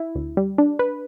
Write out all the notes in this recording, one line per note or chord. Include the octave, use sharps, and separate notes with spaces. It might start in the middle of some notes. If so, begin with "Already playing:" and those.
Already playing: E4
D2
G3
D4
B4